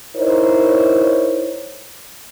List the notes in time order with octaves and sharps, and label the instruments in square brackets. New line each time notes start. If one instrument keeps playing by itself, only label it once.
[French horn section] D#4 E4 A#4 C5 C#5